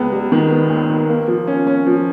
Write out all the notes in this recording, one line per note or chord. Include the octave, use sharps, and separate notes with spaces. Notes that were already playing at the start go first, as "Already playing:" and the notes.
Already playing: C#2 B3
G3
D#3
B3
D#2
D#3
A#3
F3
C#4
C#4
F3